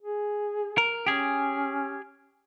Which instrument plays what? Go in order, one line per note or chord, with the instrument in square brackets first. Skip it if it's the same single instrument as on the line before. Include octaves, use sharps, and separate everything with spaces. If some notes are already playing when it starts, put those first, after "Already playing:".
[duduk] G#4
[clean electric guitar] A#4
[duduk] C#4 [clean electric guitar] G4 G#4